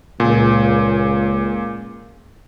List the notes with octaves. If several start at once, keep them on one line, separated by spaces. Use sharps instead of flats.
C#2 A#2 G#5